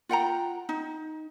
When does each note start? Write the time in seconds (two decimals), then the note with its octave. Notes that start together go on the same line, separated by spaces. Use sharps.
0.09 F4 F#5 G5 A#5
0.69 D#4